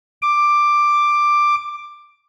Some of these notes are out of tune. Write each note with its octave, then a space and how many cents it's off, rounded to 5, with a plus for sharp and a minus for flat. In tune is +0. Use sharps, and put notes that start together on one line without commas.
D6 +10